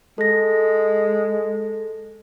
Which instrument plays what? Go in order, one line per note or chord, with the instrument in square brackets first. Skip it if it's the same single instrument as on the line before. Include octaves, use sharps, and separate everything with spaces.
[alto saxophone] G#3 [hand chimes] A4 A#6